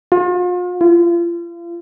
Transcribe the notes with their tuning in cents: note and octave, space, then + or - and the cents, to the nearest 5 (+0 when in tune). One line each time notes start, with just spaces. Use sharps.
F4 +40
F4 -35